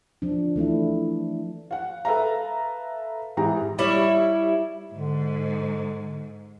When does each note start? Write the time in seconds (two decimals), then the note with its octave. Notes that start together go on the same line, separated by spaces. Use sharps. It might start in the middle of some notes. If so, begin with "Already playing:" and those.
0.22 F3 D4
0.56 E3 A3 D4 E4
1.71 F5 F#5
2.05 A4 B4 E5 F5 A#5
3.37 G#2 E3 E4 G4 A#5
3.79 G3 E4 C#5
4.94 G#2 D3